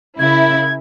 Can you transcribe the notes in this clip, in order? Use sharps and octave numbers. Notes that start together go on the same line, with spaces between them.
C#3 E4 A#4 G#6